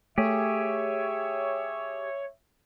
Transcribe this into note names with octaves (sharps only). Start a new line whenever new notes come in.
A3 G4 G#4 C#5 E5